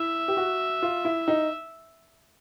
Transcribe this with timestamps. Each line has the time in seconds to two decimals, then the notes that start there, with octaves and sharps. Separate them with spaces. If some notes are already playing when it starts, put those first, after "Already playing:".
Already playing: E4 E5
0.28 G4
0.37 F#4
0.82 F4
1.05 E4
1.28 D#4